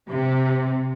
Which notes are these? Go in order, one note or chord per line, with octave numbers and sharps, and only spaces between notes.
C3